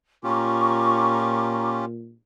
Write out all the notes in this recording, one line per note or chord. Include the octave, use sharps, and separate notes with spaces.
A#2 C#4 F4 G4 A#5 C#6 D6